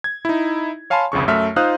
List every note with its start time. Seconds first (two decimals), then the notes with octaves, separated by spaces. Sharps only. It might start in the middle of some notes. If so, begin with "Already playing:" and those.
0.04 G#6
0.25 D#4 E4
0.90 C#5 F5 G#5 A5 B5 C6
1.12 G1 C2 F2 C#3 C#6
1.28 F#2 A3 E5 F6
1.56 D#4 F4 C5 F5 D#6 F#6